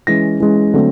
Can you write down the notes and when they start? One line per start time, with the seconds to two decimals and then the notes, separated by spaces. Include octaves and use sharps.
0.07 E3 G#3 C#4 A#6
0.40 E3 G#3 C#4
0.74 D3 F#3 A3 C4